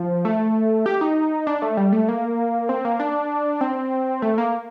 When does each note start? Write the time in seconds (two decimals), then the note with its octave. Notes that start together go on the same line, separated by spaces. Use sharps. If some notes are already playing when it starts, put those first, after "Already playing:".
Already playing: F3
0.25 A3
0.86 G4
1.01 D#4
1.47 D4
1.62 A3
1.77 G3
1.92 A3
2.09 A#3
2.69 C4
2.85 A#3
3.00 D4
3.61 C4
4.22 A3
4.38 A#3